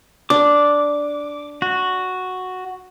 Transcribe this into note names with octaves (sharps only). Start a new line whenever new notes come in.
D4 D6
F#4